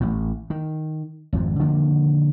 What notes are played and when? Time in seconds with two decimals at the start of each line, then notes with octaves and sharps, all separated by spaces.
0.01 A1 A2
0.50 D#3
1.33 G#1 F2 G#2
1.59 D3 D#3 F3 A#3